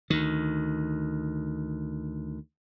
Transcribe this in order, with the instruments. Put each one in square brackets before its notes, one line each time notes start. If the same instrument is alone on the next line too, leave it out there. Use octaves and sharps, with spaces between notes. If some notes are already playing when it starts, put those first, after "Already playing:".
[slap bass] D2 D#3